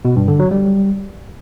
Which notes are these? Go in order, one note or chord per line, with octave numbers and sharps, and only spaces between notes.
B2
G2
D3
F#3
G3